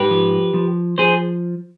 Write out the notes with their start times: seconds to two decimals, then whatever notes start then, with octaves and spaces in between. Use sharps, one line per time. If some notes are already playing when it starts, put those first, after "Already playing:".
Already playing: G#2 G4 B4
0.11 F3
0.54 F3
0.98 F3 G#4 C5